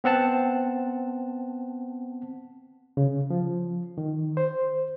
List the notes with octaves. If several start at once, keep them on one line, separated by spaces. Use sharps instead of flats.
B3 C4 F#5 A5
C#3
F3
D#3
C5